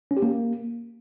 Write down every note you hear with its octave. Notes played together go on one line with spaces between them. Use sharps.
C#4
G4
A#3